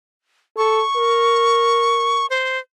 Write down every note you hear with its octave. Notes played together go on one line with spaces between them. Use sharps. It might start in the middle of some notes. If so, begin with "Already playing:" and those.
A4 C#6
A#4
C5